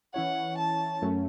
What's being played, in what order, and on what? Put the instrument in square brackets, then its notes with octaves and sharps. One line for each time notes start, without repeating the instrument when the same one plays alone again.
[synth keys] E3 C#4 E4 C#5 [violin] F#5
[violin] A5
[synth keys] F#2 F#3 A3 C#4